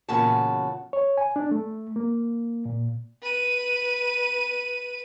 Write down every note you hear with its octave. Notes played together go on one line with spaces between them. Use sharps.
E2 A#2 C#3 F#4 A5
C#5
G#5
D4
A3
A#3
A#2
B4 D#7